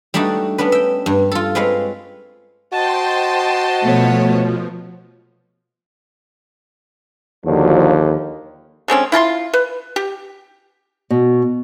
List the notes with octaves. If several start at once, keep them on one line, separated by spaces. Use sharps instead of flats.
G3 A3 D4 D#4 F#4 A4
B3 C#4 D4 B4
E5 G5
G2
F4 A4
G#3 C4 B4 C#5 F5
F#4 C5 D#5 G5 A5 C6
B2 F3 A3 B3 C#5
D#2 D3 F3 F#3
D3 G#3 C4 C#4
E4 F4 A5 C6
B4
G4
B2